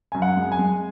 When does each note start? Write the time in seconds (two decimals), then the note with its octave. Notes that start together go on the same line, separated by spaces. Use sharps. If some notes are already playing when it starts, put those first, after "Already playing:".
0.12 F#2 G#5
0.22 F#5
0.37 G#3
0.52 G#5
0.59 G#3